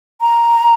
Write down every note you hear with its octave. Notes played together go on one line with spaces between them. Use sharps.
A#5